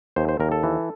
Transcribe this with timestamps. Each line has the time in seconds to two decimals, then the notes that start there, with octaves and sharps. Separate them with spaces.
0.16 D#2 C5
0.29 C5
0.40 D#2 A#4
0.52 A4
0.63 E3